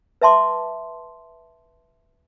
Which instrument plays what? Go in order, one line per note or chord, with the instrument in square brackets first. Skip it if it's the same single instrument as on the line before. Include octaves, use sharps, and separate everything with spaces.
[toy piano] B4 E5 A5 C6 D6